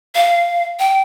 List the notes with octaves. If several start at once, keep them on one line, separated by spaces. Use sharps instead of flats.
F5
G5